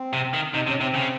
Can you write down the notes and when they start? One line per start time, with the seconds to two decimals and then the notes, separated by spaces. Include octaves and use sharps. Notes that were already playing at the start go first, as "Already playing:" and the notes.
Already playing: C4
0.13 C3
0.34 D#3
0.54 C3 D#4
0.67 C3 C#4
0.80 C3 C4
0.94 C#3